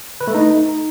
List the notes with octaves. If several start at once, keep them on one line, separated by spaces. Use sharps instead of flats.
B4
A3
D#4